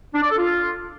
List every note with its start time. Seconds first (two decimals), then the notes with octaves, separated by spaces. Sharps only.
0.14 D4
0.22 D5
0.30 A4
0.38 F4